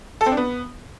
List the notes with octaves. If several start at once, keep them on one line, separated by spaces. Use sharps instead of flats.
A4
C4
D4
B3